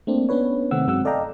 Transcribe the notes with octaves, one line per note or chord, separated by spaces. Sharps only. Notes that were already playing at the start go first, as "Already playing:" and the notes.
A3 A#3 C4 D4
B3 C#4 D4 B4 C#5
C3 D#3 A3 C4 F#5 E6
G2 F#3 G#3 C4 F#5 E6
A4 D5 D#5 F5 G5 A#5